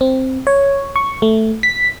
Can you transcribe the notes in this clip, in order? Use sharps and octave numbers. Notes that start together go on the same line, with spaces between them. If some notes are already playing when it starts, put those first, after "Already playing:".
C4
C#5
C#6
A3
B6